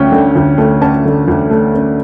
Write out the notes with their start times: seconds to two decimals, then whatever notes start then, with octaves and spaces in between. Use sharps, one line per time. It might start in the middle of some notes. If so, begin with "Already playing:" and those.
Already playing: D2 A3 C#4 G5
0.12 D3
0.35 D2
0.58 A3
0.81 C#4 A5
1.05 D3
1.28 D2
1.50 A3
1.74 C#4